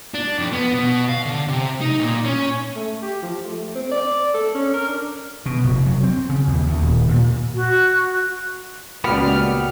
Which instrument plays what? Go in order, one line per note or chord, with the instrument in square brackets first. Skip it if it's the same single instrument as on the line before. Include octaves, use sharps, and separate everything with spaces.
[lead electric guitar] D4
F2
B3
B2
F5
D3
C3
D#4
A#2
C#4
[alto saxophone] A3
G4
F3
A3
C4
D5
A4
C#4
A#4
D4
[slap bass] B2
F1
F#3
C4
C#3
D#2
D2
D#1
A#2
[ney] F#4
[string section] C#2 [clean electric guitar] A#2 G3 B3 [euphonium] F#4 [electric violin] F6